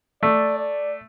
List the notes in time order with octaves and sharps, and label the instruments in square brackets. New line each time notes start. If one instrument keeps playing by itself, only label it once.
[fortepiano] A3 [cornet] D5
[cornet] D5